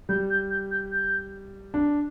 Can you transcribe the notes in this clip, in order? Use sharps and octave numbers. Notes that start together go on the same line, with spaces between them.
G3 G6
G6
G6
G6
G6
D4